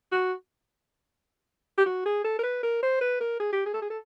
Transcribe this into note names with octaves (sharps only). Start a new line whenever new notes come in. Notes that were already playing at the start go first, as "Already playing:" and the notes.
F#4
G4
F#4
G#4
A4
A#4
B4
A#4
C5
B4
A#4
G#4
G4
G#4
A4
G#4
A4